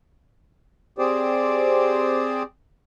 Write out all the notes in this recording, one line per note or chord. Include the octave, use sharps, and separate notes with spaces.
C4 G4 G#4 C5 D5